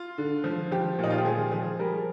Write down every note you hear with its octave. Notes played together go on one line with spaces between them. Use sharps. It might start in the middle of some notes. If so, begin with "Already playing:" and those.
Already playing: F4
D3
F3
F3 G4
A#2
D#4
F4
G4
F3 G#4
F3 G#4
G3 A#4